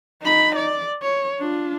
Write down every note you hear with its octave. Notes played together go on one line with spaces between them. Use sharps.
D#4 B5
D5
C#5
D4 F4